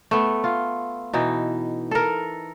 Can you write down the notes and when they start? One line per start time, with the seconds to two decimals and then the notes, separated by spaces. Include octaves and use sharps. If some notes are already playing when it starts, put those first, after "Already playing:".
0.11 A3 B3
0.44 F4
1.13 B2 E3 D#4
1.91 A4 A#4